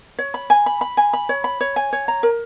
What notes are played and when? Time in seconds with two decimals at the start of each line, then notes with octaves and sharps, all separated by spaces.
0.19 C#5
0.34 B5
0.50 G#5
0.66 B5
0.81 B5
0.97 G#5
1.13 B5
1.29 C#5
1.44 B5
1.61 C#5
1.76 G#5
1.93 C#5
2.08 A#5
2.23 A#4